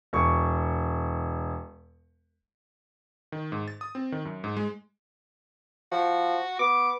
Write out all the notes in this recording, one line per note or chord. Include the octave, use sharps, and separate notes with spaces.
E1 C#6
D#3
G#2
A6
D#6
C4
D#3
F#2
G#2
G#3
F3 F#4
B3 D6